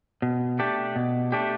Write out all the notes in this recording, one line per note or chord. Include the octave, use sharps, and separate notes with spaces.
B2
A3 D4 G4
B2
A3 D4 G4